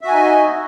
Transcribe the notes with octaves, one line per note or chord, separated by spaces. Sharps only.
D#4 F#4 D#5 E5 G#5